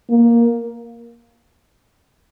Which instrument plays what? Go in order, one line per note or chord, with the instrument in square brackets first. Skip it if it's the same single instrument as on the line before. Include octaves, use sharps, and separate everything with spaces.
[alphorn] A#3